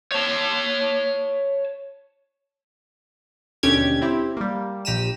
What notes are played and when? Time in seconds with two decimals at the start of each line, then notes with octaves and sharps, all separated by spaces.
0.12 C#5 A5
3.63 D#2 B2 D3 C#4 G4 G#6
4.02 C4 E4 G4
4.37 G3 A#3
4.85 A#1 G4 A#5 B6 D#7 E7